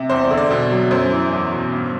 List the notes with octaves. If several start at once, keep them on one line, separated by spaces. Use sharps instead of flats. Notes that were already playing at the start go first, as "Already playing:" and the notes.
Already playing: C3
E2 C5
D5
D3
D5
B2
F#3
F#2 C5
E3
E2
B2
G2